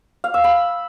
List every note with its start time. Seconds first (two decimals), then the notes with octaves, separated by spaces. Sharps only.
0.24 F5
0.34 E6
0.44 B5